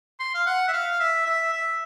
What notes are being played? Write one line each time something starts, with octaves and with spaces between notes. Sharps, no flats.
C6
F5
F#5
E5
F5
E5
E5
E5